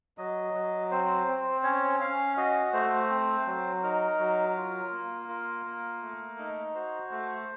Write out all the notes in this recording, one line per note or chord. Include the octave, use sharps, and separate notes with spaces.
F#3 D#5
F#3
C4 C5
C4
C#4 C#5
C#4 F5
F#4 D#5
A3 C5
C4
F#3
D#4 A#4
F#3
F4
A#3
F4 A#4
A#3
A3
D#4
F#4 C5
A3